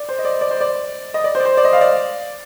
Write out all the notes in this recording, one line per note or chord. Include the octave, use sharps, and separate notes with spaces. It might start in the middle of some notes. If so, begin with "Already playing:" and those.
Already playing: D5
C5
D#5
D5
D5
C5
D5
D#5
D5
C5
D5
C5
D5
D#5
F5
D5